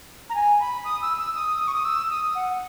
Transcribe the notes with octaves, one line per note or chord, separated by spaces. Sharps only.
A#5
G#5
B5
D#6
E6
E6
D#6
D#6
C#6
D#6
E6
D#6
F#5